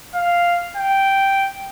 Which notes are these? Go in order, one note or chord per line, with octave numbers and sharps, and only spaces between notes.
F5
G5